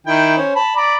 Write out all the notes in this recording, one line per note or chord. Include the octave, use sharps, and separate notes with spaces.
D#3 E4 G5
C#4 C5
A5 B5
D5 A#5 B5